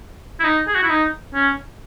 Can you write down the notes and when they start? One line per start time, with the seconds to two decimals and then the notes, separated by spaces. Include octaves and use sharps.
0.40 E4
0.44 D#4
0.68 G#4
0.75 F#4
0.83 E4
0.90 D#4
1.34 C#4